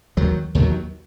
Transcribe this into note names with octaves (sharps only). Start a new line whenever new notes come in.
D#2 D#3 F#3
D#2 D#3 F#3